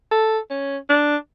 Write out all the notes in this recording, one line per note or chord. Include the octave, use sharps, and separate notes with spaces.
A4
C#4
D4